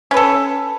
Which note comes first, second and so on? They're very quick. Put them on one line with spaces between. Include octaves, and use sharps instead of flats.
C#4 B4 A4